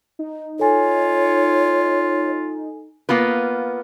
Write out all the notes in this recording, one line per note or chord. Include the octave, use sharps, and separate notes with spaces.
D#4
F4 A4 C#5 G#5
A#3 B3 F4 B4